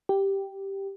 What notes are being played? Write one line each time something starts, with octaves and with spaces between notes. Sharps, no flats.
G4